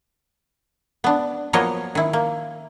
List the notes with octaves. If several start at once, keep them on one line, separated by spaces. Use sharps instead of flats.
B3 D4
F3 F#3 A#3 B3 C#5 D#5
D#3 E4
A#3